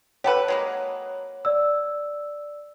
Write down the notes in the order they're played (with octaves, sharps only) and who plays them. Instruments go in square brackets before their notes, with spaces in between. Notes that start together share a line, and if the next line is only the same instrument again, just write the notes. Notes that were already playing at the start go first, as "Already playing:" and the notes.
[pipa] G4 A4 B4 [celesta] C#5 F#5
[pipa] F#3 G#3 A#3
[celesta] D5 E6